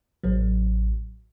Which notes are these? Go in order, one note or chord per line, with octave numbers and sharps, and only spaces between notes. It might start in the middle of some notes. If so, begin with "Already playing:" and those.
A1 F#3